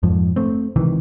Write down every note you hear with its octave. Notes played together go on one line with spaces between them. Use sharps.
F2 G#2 F3
A3 C4
C#2 C3 D#3 E3